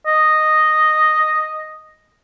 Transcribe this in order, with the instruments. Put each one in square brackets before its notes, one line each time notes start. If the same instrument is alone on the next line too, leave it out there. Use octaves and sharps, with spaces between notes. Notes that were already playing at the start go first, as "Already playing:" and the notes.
[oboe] D#5